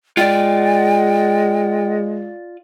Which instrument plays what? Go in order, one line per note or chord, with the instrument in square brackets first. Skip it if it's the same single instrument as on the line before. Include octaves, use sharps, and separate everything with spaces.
[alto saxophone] G#3 [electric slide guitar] F4 D5 [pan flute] G5